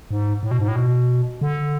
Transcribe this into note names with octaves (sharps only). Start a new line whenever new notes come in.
G#2
A2
B2
G#2
A2
B2
D3